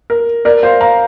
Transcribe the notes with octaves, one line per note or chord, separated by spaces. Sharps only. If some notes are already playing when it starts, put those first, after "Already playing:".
A#4
A#4 D5
C5 F5
F5 A#5